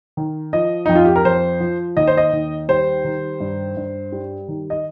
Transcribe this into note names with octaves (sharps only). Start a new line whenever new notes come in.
D#3
F3 D#5
F2 D#4
F4
G4
A#4
F2 C5
F3
D#2 D#5
C5
D#5
D#2
G3 C5
D#3
G2
G2
G3
D#3
D#5